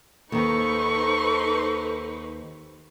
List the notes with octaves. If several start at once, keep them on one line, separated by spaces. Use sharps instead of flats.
D#2 D#3 D#4 A4 B4 C5 C#6